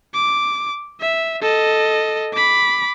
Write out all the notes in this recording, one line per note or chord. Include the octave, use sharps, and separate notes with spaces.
D6
E5
A4 D#5
B5 D6